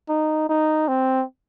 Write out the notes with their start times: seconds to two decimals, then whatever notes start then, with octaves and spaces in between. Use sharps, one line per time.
0.09 D#4
0.49 D#4
0.88 C4